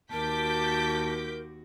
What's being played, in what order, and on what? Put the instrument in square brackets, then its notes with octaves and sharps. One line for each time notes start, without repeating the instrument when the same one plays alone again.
[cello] D#2 F#4 [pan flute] A#4 [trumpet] A5 [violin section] D6 G6 B6